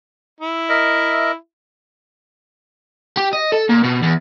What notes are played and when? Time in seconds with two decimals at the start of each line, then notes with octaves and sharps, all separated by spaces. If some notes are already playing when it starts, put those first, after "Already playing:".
0.41 E4
0.69 A#4 D#5 E5
3.17 G4
3.33 D#5
3.52 A4
3.69 A#2
3.84 B2
4.02 E2